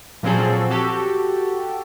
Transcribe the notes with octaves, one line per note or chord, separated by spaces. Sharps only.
A#2 F3 F#3 C4 G#4 A4
F#4 G4 A4